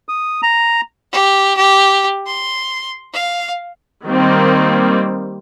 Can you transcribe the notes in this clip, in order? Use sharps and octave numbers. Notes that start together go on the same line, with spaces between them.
D#6
A#5
G4
G4
C6
F5
D#3 G3 A#3 C4